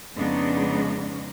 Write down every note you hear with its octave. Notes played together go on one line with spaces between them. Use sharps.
F2 C#3 G#3 B3 D4 D#4